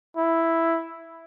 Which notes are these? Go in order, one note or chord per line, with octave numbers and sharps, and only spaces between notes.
E4